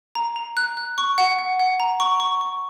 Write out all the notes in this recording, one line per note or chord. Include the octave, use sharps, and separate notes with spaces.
A#5
A#5
F#6
F#6
C#6
F#5
F#5
F#5
A#5
C#6
C#6
C#6